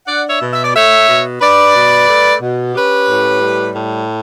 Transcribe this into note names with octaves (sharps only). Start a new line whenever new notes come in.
D4 D5 F#5
C#5 E5
B2
E5
D5
A3 C#5 E5
B2
D4 B4 D5
B2
A3
B2
C#4 G4 B4
A2
G3
A2